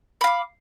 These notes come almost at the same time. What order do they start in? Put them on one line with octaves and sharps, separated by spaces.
B5 F5 D6